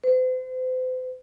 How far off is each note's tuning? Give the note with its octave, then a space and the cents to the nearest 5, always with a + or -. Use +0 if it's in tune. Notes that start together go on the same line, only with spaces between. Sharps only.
C5 -40